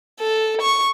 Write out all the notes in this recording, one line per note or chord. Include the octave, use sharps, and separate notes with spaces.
A4
C#6